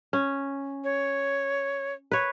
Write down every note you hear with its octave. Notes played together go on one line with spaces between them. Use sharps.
C#4
C#5
B4 C#5